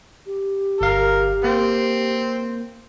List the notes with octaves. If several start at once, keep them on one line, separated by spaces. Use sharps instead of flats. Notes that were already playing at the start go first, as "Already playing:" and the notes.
G4
G1 A#4 F5
A#3 C4